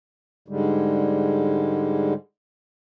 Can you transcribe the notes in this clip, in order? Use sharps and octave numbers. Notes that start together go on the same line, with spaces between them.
G#2 D3 G3 G#3